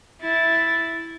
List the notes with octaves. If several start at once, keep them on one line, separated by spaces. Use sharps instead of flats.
E4 A6